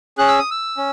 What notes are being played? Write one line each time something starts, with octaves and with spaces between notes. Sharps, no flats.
C#4 G#4 F#6
E6
D#6
E6
C#4